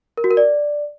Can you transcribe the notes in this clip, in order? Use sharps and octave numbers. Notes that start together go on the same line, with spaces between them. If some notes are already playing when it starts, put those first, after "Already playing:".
A#4
F#4
A#4
D5